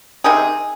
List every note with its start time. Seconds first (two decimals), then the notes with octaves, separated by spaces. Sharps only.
0.24 C3 D#3 G#4